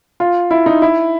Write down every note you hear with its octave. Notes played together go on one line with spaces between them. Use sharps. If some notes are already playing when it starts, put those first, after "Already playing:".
F4
E4
D#4
E4